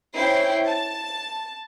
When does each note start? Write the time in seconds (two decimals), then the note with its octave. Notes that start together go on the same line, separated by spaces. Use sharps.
0.15 C#4 E4 C5 G5 C7
0.65 A5